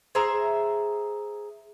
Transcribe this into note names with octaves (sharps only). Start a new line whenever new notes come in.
G#4 C5 E5 A#5